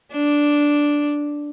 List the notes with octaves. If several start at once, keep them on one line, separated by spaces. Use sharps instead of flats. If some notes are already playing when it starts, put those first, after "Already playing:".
D4